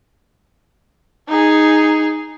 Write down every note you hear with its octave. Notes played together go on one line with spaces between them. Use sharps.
D#4 G#4